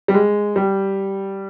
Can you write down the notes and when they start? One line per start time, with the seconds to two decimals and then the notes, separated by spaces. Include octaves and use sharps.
0.08 G3
0.14 G#3
0.56 G3